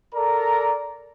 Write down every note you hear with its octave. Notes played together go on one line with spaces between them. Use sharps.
A4 A#4 D5 A#5